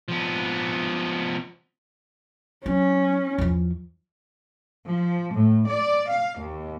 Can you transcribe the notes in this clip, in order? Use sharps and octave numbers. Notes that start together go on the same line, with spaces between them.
F3 B3
F#3 C#4
E2 F3
F3
A2
D5
F5
D#2